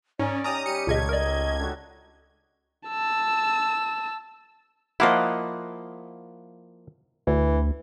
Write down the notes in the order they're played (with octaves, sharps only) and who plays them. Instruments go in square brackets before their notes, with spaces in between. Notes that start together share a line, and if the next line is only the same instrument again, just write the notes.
[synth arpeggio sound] G#2 [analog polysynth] C#4 [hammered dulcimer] G#4 A#4 [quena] D5
[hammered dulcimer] C#4 D#4 G4 [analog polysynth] A#5 D#6
[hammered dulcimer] G3 [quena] G4 [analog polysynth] C#7 D#7
[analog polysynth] C#2 G#6 [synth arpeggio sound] A#2 C#3 D#5 [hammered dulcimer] A3
[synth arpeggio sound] A#4 D5 [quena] D#5
[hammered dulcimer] D3 F#4
[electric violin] A5 E6
[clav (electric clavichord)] F3 A#3 E4 [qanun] D#5 F5 F#5
[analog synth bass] D2 [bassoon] E3